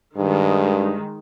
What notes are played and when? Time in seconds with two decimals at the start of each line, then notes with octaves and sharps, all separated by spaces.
0.17 G2 D#3 G#3